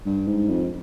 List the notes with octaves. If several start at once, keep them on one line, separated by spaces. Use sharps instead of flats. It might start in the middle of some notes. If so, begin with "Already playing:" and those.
G2
G#2
F2